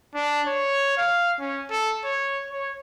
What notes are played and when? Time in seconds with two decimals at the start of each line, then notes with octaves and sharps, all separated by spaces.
0.15 D4
0.47 C#5
0.98 F5
1.39 C#4
1.70 A4
2.05 C#5
2.51 C#5